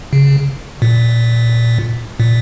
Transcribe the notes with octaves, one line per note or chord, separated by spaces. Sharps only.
C#3
A#2
A#2